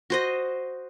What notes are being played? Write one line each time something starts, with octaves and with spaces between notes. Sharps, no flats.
F#4 C5 D#5